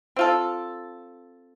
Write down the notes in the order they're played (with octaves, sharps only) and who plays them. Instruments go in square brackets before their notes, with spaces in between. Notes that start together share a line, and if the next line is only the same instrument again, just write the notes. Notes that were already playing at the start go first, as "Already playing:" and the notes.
[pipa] C4 F4 A4